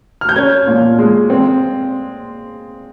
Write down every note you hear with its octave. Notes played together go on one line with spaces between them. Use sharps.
F6
G6
C#4 G#6
A#2
G#3
C4